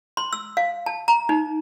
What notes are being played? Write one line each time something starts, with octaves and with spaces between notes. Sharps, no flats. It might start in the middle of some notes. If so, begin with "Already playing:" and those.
C6
E6
F5
A5
A#5
D#4